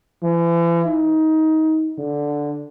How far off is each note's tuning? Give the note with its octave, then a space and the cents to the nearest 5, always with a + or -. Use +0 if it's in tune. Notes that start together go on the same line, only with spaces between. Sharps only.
E3 +40
D#4 +20
D3 -5